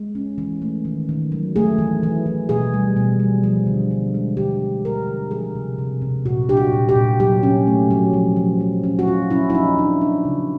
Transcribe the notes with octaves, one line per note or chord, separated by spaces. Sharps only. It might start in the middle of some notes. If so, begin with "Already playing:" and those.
Already playing: G#3
C#4
E3
A3
D#3
D#3
F#3
A3 G#4
E3
E3
E3
B2 G#4
G3
B2
G3
F3
D3
D3
G#3
D3 G4
D3
D3 A#4
D3
F3 G#4
C3
C3
C3
A#2 F#4
D4 G4
F#4
A#2
G4
A#2
F#3 G4
C#4
A3
F#3
F3
F3
F3
C#4
F#4
F3 F4
C#4 E4
E4
F3 D#4
C#4 D4
F3 D4
C#3